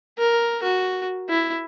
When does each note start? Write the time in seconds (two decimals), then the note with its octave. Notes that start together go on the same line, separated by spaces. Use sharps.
0.18 A#4
0.63 F#4
1.29 E4